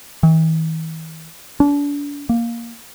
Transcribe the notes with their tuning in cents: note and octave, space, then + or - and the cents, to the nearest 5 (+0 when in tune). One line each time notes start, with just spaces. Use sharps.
E3 -45
D4 -35
A#3 +5